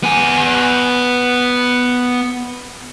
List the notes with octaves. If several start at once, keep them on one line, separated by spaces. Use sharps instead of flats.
B3 G#5